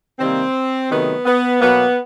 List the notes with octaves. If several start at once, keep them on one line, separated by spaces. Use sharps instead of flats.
C3 D#3 G3 A#3 C4
C3 D#3 F#3 A3 B3
B3
B2 F#3 A#3 B3